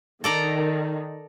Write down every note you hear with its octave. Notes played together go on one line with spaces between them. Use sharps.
D#3 A4 D5 A#5